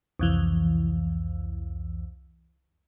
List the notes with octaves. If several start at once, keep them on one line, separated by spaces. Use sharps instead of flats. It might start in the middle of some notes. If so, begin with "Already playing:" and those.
C2 F2 E3